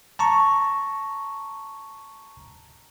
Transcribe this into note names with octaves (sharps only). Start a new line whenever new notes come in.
A5 A#5 C#6